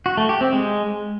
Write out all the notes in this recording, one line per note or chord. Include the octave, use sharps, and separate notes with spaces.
F#4
A3
G4
C4
G#3